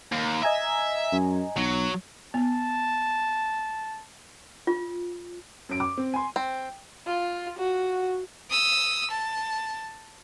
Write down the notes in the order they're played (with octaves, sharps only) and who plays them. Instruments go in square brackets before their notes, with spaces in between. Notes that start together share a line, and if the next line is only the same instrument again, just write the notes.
[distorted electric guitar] D#2
[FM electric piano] D#5 G#5 A#5 [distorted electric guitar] E5
[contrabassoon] F#2
[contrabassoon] B1 [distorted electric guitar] F#3
[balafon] B3 [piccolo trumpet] A5
[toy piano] F4
[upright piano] F#2 D7
D6
C4
G#5 C6
[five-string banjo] C4
[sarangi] F4
F#4
[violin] D#6 E6
A5